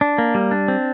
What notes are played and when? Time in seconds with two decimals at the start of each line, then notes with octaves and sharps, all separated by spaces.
0.01 D4
0.18 A#3
0.35 G3
0.51 D4
0.68 C4